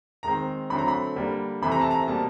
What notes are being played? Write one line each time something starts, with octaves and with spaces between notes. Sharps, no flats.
D#3 G#3 C4 A#5
D3 F#3 A3 C4 B5
A#5
B5
D3 G3 A#3
C3 E3 A3 C4 B5
A#5
A5
A#5
B2 G3 A#3 A5